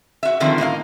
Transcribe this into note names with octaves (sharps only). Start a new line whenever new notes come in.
F#4 E5
D3 D#3 F3 G3 C4
A2 A#3 D#4 F5